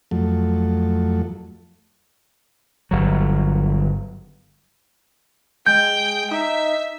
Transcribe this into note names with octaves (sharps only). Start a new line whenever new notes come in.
F2 F#3 A3
G1 F#3
G#3 G5 G6
D#4 E5